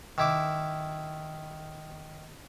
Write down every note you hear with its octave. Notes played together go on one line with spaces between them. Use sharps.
D#3 E4 D6